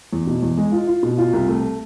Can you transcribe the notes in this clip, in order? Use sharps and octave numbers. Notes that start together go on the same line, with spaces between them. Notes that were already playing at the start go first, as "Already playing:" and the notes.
E2
B2
E2
G#3
F4
F4
B2
F4
C2
A3